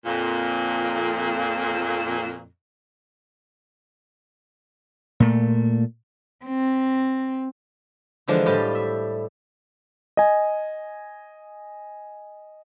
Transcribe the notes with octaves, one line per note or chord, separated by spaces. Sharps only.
F2 A#2
A#2 A3
C4
D3 E3 F3 G#3 D4
A2 G3 F4 G4 D#5 A5
E5
D#5 G#5